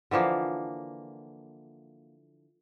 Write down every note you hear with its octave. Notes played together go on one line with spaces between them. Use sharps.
D3 E3 F3 A#3